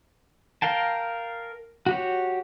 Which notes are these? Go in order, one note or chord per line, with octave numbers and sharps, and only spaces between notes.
A#4 F5 G5 A5
F#4 G4 C#5